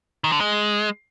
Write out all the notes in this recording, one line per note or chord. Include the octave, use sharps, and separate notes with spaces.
D#3
D3
G#3